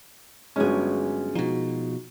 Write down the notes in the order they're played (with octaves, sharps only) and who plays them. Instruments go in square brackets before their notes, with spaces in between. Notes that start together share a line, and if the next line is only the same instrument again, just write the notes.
[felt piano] G1 F#3 C#4 [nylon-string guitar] G#3 G#4
[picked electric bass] B2 F3 [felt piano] D#4 F#4